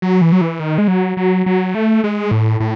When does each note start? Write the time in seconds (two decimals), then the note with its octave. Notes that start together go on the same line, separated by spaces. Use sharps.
0.02 F#3
0.21 E3
0.32 F#3
0.41 E3
0.60 D#3
0.78 G#3
0.88 F#3
1.17 F#3
1.46 F#3
1.75 A3
2.04 G#3
2.31 A2
2.60 A2